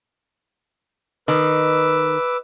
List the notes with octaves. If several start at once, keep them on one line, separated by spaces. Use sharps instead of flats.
D#3 B4 D6 E6